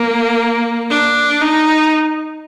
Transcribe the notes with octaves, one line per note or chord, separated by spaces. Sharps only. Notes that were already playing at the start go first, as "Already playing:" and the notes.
Already playing: A#3
D4
D#4